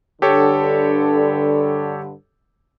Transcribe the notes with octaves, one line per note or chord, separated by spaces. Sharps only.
G2 D3 G4 A4 C#5